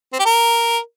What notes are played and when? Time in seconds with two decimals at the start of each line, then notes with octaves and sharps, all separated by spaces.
0.13 C4
0.19 G4
0.25 A#4